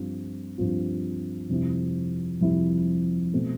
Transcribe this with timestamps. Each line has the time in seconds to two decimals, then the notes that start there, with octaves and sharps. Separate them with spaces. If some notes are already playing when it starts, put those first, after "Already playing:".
Already playing: G2 F3 C4 F4
0.58 G2 F3 C4 F4
1.50 F2 C3 G3 C4 E4
2.41 F2 C3 G3 C4 E4
3.33 B2 A3 C4